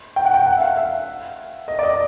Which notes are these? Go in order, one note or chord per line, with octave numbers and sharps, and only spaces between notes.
G5
F#5
G5
F#5
E5
F5
E5
D#5
D5
D#5